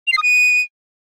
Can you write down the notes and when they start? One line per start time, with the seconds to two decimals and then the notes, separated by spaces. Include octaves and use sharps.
0.07 F7
0.12 C7
0.17 D#6
0.23 D#7